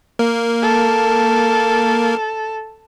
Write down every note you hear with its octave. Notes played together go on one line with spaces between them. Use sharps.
A#3 A#4
A4